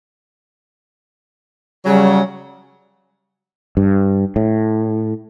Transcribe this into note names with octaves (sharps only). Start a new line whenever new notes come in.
C#3 F#3 G3
G2
A2